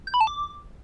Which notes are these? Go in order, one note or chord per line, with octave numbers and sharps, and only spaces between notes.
G6
B5
A5
D6